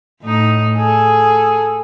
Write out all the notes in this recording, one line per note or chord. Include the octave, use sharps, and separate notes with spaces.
A2 D#4
G#4 A4